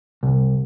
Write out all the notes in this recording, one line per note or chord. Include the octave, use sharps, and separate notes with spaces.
C2